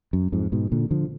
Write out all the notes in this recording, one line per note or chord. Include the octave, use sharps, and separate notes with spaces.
F#2
F2 G#2
G#2 B2
A#2 D3
D3 F3